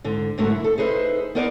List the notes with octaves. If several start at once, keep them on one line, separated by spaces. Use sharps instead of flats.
G#2 D3
G#2 B2 D3 F#3 A3 A#4
E4
A4
D#4 G#4 B4 C5 D5 E5
B3 D#4 A#4 C5 D5